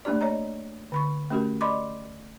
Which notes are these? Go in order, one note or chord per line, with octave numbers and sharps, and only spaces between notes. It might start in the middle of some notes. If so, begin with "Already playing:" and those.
A3 A#3 D4 G4 D5
C#5 D#5 A#5
D3 B5 C#6
A3 C#4 F#4 G4 A#4
D5 D#5 B5 C6 D6